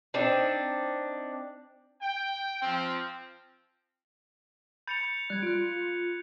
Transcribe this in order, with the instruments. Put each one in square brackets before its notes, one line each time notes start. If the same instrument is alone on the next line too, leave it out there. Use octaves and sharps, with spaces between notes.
[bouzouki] C4 D4 D#4
[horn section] G5
F3 C4
[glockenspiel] B5 A6 [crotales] G6 C#7 F7
[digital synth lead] G3 [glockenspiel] F#6 G#6
[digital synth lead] F4 [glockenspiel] F#6 D7